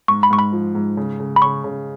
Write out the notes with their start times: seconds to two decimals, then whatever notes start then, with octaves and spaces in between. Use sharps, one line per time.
0.08 G#2 C#6
0.23 B5
0.31 G#2 C#6
0.39 B5
0.52 F3
0.75 G#2
0.97 C#3
1.20 C#3
1.36 B5
1.42 C#3 C#6
1.64 C#3